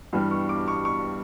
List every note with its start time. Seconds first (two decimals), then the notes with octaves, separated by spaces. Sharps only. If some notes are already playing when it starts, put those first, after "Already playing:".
0.13 G2 E3 G3
0.31 C#6
0.49 D6
0.68 C#6
0.85 C#6